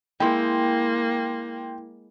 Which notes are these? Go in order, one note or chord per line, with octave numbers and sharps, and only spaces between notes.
G#3 A#3 E4 G5 C6